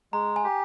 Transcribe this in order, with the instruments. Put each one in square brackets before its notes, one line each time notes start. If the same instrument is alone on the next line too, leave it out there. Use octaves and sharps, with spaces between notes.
[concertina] G#3 [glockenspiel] A#5
[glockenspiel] G#5
[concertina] G4